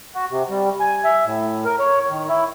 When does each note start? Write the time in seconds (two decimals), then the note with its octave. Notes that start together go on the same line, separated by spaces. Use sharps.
0.15 F#4
0.31 C3
0.50 G3
0.80 G#5
1.05 E5
1.25 A2
1.65 A#4
1.79 C#5
2.10 D#3
2.28 E4